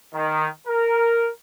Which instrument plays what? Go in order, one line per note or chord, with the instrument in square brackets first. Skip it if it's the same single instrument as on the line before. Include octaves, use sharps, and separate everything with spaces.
[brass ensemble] D#3
A#4